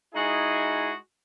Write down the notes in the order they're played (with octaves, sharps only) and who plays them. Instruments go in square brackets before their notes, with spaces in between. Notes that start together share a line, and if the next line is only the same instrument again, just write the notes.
[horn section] G#3 D#4 E4 F#4 G#4